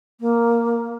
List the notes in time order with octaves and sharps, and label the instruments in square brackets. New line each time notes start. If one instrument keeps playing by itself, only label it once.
[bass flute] A#3